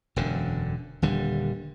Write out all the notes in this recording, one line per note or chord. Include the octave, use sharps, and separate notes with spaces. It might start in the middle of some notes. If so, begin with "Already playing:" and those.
E1 F#2 D3
D#1 D3 G3